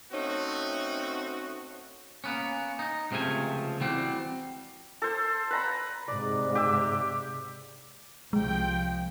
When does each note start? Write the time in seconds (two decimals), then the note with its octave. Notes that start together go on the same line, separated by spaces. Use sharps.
0.12 A3 C4 C#4 D#4 F#4
2.24 A#3 B3 C#4
2.79 D#4
3.11 C#2 C3 F3 A3 G#5
3.81 E3 G3 C4 F#4
5.02 A4 C5
5.51 B4 A#5 B5
6.08 G#2 C3 D5
6.55 G4 E5
8.33 C2 F3 G#3 G5